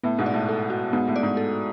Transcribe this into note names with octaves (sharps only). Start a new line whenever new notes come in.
A2 B3
G#2 B2
D5
A2
A4
F#4
G#2 B3
A2
D5
G#2
A4